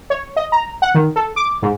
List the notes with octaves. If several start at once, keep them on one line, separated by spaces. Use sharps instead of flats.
C#5
D#5
A#5
F#5
D#3
A4
D6
G#2